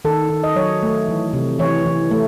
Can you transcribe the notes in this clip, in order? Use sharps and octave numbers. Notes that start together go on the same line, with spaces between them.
D#3 A4
D#3
D#5
F#3 C#5
A3
E3
C3
E3 C#5
E3
A3